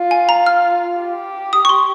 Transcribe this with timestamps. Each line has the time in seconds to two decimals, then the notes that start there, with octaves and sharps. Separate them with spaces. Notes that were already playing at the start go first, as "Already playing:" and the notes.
Already playing: F4
0.11 G#5
0.29 A#5
0.46 F6
0.99 G4
1.53 D#6
1.65 C#6
1.69 C6